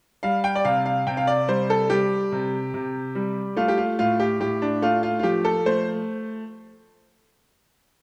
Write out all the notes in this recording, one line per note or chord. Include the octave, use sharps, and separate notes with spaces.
G3 F5
G5
D5
C3 F5
F5
C3 G5
F5
D5
G3 C5
A4
G3 G4
C3
C3
G3
A3 F4
G4
F4
A2 F4
G4
A2 G4
D4
A3 F4
F4
F4
F3 G4
A4
A3 C5